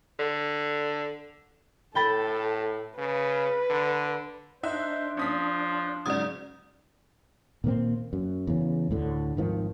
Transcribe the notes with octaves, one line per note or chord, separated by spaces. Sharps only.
D3
A2 A4 G5 B5 A6
C#3 B4
D3
D4 D#4 C5 E5 F#6
F3 C#4 D#6 B6
G#2 C#3 F#3 D5 D#6 G#6 A6
A#2 D#3 A#3 C4
F#2
E2 C#3
D2 A2 D3
G#1 D#3 F3